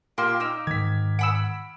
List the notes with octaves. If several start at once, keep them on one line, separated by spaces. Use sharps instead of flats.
A#2 A#3 G4 C6 D6
D#4 D6 E6 F6
G#2 D#3 G#6 B6
F#5 B5 E6 D7